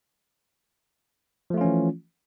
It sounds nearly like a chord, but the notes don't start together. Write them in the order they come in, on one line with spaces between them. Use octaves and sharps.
F3 A3 F4 C#4 E3